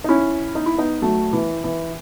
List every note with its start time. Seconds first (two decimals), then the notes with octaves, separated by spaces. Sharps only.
0.04 D#4
0.09 C#4 E4
0.55 D#4
0.66 E4
0.78 B3 D#4
1.02 F#3 A3
1.33 E3
1.64 E3